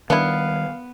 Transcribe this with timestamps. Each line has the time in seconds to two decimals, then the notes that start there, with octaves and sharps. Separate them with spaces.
0.10 D#3 G3 B3 D4 E4 F5